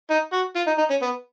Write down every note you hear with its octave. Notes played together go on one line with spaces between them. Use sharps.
D#4
F#4
F4
D#4
D#4
C#4
B3